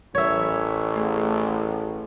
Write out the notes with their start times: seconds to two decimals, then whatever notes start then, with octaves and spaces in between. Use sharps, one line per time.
0.15 A1 A#4 C#5 E5
0.96 A3 G#4